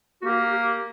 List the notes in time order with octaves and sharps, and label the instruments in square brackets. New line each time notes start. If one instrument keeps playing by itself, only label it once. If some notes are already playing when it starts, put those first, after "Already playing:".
[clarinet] F#4
[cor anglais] A#3 [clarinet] G4
[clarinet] G4